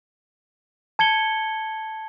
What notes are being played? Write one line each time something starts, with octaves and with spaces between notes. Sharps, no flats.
A5 G#6 C#7 G7